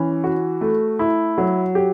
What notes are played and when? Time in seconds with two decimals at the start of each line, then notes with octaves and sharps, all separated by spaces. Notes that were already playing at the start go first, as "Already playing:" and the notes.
Already playing: E3 C#4
0.24 F#4
0.61 A3
0.99 E4
1.38 F#3
1.75 G4